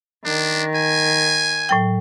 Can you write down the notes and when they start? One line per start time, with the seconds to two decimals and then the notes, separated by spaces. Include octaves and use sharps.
0.25 D#3 D4
0.75 G#5
1.69 A2 F#3 G5